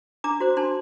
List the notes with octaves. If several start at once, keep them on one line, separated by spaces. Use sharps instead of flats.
D4 A#5 D6
F#4 C5
D4 A5 C6